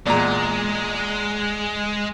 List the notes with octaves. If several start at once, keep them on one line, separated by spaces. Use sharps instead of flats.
E2 A#2 G#3 D5 A#5